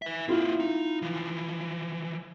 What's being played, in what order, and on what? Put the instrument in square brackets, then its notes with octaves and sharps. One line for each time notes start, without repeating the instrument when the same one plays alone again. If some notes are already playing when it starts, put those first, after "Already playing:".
[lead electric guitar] B4 E5
[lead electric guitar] A#3 C4 [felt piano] E4 F4
[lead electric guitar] D#4
E3 F3